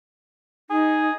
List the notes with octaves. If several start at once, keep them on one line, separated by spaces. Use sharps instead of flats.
D#4 G#4